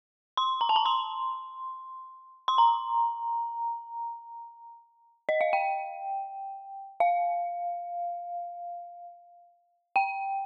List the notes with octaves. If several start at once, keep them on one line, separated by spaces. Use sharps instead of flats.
C6
A#5
A5
A#5
C6
C6
A#5
D#5
F5
G5
F5
G5